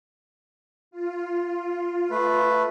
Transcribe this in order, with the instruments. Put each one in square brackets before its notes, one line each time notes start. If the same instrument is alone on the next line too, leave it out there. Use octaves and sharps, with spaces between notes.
[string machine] F4
[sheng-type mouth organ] A3 B4